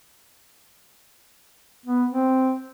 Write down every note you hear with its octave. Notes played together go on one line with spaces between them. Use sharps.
B3
C4